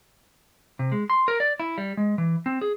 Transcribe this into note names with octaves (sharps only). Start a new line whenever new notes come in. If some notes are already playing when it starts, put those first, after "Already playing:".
C3
G#3
C6
A#4
D5
E4
G3
G#3
E3
C4
G#4